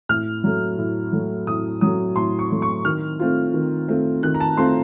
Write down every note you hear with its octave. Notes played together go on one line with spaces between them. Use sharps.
A2 F6
F#3 A3
A2
F#3 A3
A2 D#6
F#3 A3 D#6
A2 C6
C#6
F#3 A3
C#6
D#3 F6
A3 C4 F4
D#3
A3 C4 F4
D#3 F#6
A#5
A5
A3 C4 F4 C6